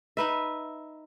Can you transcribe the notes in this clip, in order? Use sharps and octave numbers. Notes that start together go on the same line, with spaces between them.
D#4 B4 E5